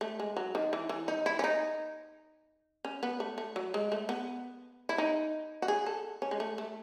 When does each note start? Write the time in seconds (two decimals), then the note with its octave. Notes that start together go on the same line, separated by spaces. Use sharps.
0.01 A3
0.20 G#3
0.37 F#3
0.55 D#3
0.73 E3
0.89 E3
1.08 D#4
1.26 E4
1.39 C#4
1.44 D#4
2.85 C#4
3.03 B3
3.20 A3
3.38 A3
3.56 F#3
3.74 G#3
3.92 A3
4.09 B3
4.89 E4
4.98 D#4
5.62 F#4
5.68 G#4
5.86 A4
6.22 C#4
6.31 G#3
6.40 A3
6.58 A3